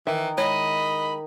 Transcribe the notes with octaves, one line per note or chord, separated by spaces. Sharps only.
D#3 E3 E5
G#3 E4 C#5 D#5 B5